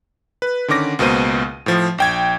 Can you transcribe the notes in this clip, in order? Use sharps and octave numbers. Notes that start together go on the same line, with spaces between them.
B4
D3 D#3 C#4 D6 A#6
C#2 B2 A#3 C5 D#7
A2 F3
A#1 G5 G#6